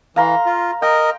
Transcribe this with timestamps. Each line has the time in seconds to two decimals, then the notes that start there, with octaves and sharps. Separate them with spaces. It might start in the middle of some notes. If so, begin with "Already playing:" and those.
0.16 E3 F5 A#5 C6
0.46 F4
0.82 A#4 D#5 G5